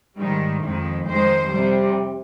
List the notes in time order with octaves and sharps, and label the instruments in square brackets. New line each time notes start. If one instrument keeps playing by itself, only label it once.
[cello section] G#2 D#3 G3
F2 D#3 G#3
F2 D#3 G#3 C5
C3 G3